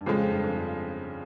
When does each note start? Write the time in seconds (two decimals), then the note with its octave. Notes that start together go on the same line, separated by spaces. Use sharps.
0.01 G2
0.06 F2 C#3 F3 G#3
0.19 F2
0.31 G2
0.44 F2
0.57 G2